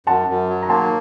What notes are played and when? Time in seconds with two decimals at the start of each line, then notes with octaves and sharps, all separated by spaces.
0.07 F#2 F#5 A5
0.28 F#2
0.49 F#3
0.63 A#5
0.69 A#3 A5 C6